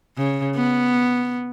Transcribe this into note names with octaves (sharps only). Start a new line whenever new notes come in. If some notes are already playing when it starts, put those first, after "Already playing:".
C#3
B3